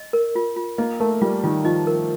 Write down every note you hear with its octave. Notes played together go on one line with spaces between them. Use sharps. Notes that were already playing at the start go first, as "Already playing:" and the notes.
Already playing: D#5
A#4
F4
F4
A#3 D#5
A3 A#4
G3 F4
D#3 F4
F3 D#5
A#4